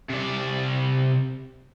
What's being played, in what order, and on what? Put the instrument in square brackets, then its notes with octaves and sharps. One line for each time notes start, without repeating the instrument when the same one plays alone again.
[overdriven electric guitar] C3 D5